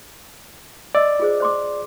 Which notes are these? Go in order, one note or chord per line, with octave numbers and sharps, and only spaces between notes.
D5 D#5 E6
F4 G#4 C5
C5 C6 D6